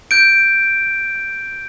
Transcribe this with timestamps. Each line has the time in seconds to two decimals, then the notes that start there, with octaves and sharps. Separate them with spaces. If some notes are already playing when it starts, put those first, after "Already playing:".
0.11 G6 D7